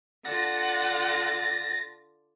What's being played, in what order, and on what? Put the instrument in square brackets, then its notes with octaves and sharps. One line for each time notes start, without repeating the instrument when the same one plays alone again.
[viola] D3 F4 [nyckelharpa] D5 A5 [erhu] F#5 [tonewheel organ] A6 A#6